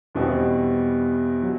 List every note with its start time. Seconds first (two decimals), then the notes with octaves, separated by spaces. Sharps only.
0.15 E2 B2 G3 C4
1.42 F#3